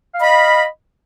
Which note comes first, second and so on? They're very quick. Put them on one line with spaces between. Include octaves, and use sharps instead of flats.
F5 D#5 B5